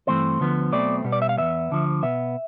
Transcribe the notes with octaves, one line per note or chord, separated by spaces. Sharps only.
G2 E3 A3 C4 C5
D2 D3 F3 B3
B1 B2 A3 C4 D5
B2 G3 B3
D5
E5
F5
E2 B2 B3 E5
D2 D3 F3
B2 B3 E5